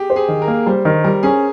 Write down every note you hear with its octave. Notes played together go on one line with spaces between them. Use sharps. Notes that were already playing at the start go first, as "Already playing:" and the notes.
Already playing: G4 G#4
C5
G#4
D#3
A#4
A#3
G3 C5
D#3 A#4
G3 A#4
C#4 G#4